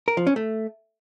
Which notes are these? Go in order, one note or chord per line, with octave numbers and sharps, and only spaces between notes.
A#4
F3
C#4
A3